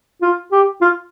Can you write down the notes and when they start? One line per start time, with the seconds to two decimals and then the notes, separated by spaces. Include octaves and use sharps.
0.22 F4
0.52 G4
0.82 F4